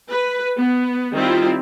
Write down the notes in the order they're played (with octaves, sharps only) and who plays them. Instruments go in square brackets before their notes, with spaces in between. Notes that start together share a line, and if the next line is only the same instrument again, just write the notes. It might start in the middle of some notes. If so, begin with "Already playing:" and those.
[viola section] B4
B3
D#3 G3 C4 E4 F4